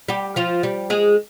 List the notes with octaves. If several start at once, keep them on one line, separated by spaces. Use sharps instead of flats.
G3 G4
F3 F4
G3 G4
G#3 G#4